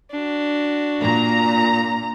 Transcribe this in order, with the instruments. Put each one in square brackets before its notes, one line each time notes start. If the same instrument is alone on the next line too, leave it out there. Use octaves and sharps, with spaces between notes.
[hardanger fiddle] D4 F#4
[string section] A#2 A#5